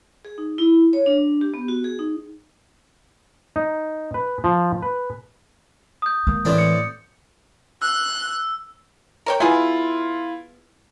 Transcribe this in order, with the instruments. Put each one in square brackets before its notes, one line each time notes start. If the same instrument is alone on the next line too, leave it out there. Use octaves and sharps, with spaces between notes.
[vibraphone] G#4
D#4
E4
C#5
D4
G4
B3
F#4
G#4
D#4
[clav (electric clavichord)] D#4
B4
F3
B4
[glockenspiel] D#6 G6
[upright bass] G#3 A#3
[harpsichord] A2 C4 D4 [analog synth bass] E3
[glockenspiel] C#7
[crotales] E6 [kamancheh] F#6
[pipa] A#4 C#5 G5
[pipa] B3 G#4 [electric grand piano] E4 F4